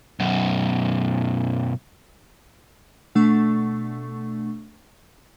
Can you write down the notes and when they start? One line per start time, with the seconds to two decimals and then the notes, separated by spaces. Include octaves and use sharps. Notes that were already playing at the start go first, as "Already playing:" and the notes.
0.20 B1 F#2
3.15 B2 A3 D4 C#6